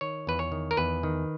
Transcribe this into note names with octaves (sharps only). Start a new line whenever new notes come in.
D#3 C#5
E2 B4
C#5
D#3
A#4
E2 B4
D#3